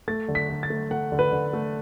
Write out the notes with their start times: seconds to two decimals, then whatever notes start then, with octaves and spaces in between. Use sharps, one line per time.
0.08 A3 A6
0.28 D3
0.35 B6
0.49 D3
0.63 A6
0.70 A3
0.91 A3 F#5
1.12 D3
1.19 B4
1.32 D3
1.53 A3